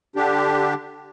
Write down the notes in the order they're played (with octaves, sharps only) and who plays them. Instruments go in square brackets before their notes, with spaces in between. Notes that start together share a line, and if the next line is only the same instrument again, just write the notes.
[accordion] D3 D4 G4